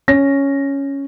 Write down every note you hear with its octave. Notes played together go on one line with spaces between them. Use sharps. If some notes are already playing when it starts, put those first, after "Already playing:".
C#4 A#6